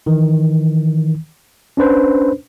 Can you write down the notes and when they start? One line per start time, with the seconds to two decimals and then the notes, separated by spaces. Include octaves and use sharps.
0.06 D#3 E3
1.77 C#4 D4 B4 C5